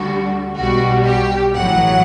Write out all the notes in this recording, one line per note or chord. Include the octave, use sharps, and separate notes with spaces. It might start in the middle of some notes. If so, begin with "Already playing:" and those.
Already playing: D2 D3 G3 F#4
B1 B2 G3 F#4
G4
A1 A2 F#3 F#5